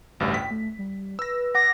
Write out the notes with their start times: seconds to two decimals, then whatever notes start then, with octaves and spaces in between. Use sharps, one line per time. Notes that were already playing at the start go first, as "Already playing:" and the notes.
0.20 A1 D2 G2
0.34 G5 B6
0.51 A3
0.79 G3
1.19 B4 E6 A#6
1.55 F#5 D6 A#6